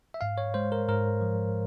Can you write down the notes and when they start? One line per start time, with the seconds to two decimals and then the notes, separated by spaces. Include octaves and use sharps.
0.14 E5
0.21 G#2 F5
0.38 C#5
0.54 G#3 C5
0.72 A#4
0.89 G#2 A#4
1.21 F3